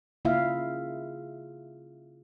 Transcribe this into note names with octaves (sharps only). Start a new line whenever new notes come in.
C#3 A#3 E4 F4 E5 F5